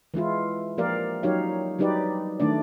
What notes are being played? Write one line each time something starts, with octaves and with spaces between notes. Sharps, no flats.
E3 G#3 E4 F4
F3 A#3 G4 A#4 D5 F5
F#3 D#4 G4 C#5 F5
F#3 G3 D#4 G4 B4 D5
D#3 A3 D4 D5